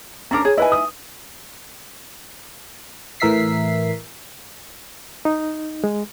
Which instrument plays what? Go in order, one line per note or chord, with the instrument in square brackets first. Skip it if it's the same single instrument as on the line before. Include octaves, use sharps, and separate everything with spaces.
[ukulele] C#4 D4 A#4 [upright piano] A#5 D6
[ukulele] G#4 [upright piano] C#5
[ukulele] E4 G#5 [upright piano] B4 D#5
[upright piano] D#6
[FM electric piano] A2 E3 A#4 E5 B6 C7
[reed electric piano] D#4
G#3